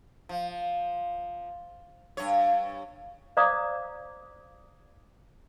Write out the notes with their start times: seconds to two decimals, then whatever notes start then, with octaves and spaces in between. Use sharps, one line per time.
0.29 F3
2.17 G2 C#5
3.37 C5 D5 F5 A#5 D6 D#6